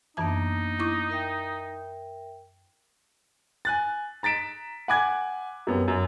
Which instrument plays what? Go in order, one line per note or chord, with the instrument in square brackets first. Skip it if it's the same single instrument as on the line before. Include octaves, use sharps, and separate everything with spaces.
[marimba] F#2 E3 A5 [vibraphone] A#3 B3 D4 [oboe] D#4
[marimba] E4 C#6 D6
[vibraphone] A#4 E5 G5
[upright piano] G#5 F#6 A6
A#5 A6 B6 D7 E7
F#5 G#5 B5 D6 F#6 G#6
F#2 G3 B3
F#2